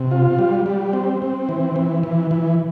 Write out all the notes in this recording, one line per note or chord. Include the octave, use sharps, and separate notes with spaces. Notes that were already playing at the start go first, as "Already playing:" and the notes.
Already playing: C3
F4
G3
G3
C4
C4
E3
E3
E3
E3